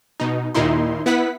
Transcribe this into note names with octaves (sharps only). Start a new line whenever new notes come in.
B2 D#4
D#2 A#2 D#3 D#4 E4 C6
B3 E4 B4 F#5 B6